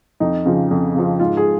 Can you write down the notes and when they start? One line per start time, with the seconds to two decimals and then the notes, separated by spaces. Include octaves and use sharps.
0.20 F2 D#4
0.46 C#3 F3
0.71 F2
0.95 C#3 F3
1.20 G#2 F4
1.37 G#4